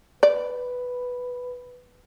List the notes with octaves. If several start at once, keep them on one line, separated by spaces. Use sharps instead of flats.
B4 D5